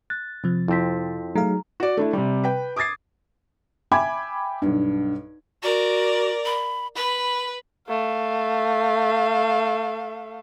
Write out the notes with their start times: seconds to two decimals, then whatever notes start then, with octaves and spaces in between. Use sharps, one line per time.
0.10 F#6 A6
0.44 C3 F3
0.68 F2 C4 E4 B6
1.36 F#3 A3 D#4 G#4 F5 A#5
1.80 F#4 D5
1.97 A3 D4 E4
2.13 C3 G3
2.44 B4 G5
2.76 D6 D#6 G#6 A6 C7
3.91 E5 G5 G#5 B5 D6 G#6
4.62 B1 G2
5.63 F#4 A#4 D5
6.46 B5
6.96 B4 B5
7.87 A3 F5